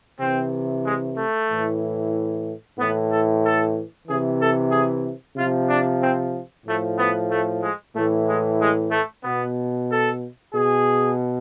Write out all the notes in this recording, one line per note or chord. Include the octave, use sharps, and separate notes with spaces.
C3 E3 C4
G#3
A3
A2 E3
A2 E3 B3
A4
A4
C3 E3 G#4
A4
G#4
C3 F3 F4
D4
C4
A2 F3 A3
B3
A3
G#3
A2 E3 A3
G#3
G#3
A3
B2 B3
A4
B2 G#4